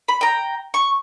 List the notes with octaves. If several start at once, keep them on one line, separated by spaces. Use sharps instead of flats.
B5
G5 A#5
C#6